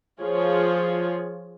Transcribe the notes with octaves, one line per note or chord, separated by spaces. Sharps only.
F3 F4 G#4 C#5